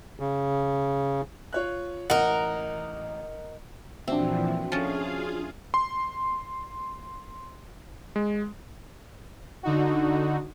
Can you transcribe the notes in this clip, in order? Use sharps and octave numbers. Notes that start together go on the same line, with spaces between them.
C#3
F4 C#5 F#6
A1 D#4 A#4 F#5
A#2 E3 F3 C4 D4 F#4 E5
F3 C#4 F4 G#4 F5
C6
G#3
D3 D#4 F#4